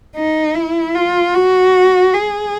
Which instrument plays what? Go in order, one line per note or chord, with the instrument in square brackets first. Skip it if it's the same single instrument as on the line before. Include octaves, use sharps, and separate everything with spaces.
[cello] D#4
E4
F4
F#4
G#4